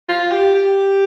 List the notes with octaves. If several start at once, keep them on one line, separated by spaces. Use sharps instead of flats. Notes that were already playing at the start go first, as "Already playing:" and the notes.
F4
G4
G4